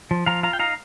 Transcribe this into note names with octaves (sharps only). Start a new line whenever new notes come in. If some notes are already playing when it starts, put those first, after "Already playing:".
F3
F3 F5 A#5
F4 F5 A#5
G5
D#4 F5 A#5